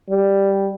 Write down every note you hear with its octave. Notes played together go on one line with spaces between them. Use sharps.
G3